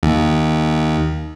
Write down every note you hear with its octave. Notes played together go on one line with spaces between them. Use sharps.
D#2